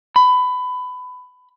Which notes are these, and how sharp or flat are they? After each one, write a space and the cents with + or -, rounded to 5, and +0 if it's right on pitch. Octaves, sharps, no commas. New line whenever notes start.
B5 +20